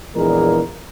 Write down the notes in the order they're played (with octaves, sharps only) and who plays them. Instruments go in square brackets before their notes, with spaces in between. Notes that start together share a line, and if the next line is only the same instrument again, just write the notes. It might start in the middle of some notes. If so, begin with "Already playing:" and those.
[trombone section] A#1 E2 A#2 E3 G#3 A#4